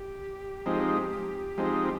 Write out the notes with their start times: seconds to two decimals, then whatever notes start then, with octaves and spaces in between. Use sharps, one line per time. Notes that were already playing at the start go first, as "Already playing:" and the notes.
Already playing: G4
0.66 F3 G#3 C4 D#4
1.58 F3 G#3 C4 D#4